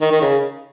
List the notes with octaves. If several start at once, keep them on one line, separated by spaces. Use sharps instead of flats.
D#3
D#3
C#3